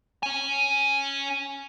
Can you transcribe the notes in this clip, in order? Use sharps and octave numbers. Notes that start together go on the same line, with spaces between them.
C#4 G#5